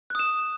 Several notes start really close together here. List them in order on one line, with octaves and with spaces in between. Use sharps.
F#6 D#6 E7